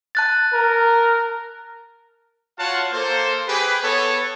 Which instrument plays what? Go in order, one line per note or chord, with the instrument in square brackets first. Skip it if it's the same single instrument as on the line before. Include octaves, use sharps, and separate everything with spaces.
[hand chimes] A5 F#6 A6
[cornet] A#4
[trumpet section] F4 F#4 C#5 F5 F#5 A5
A#3 A4 C5
G4 G#4 B4
B3 A4 C#5